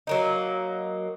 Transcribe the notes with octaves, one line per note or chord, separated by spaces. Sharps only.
F#3 A#3 D#4